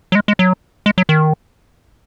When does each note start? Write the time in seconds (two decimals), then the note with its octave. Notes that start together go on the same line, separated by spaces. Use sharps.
0.12 F#3
0.15 G#3
0.28 G#3
0.39 F#3
0.86 G#3
0.98 F#3
1.09 D#3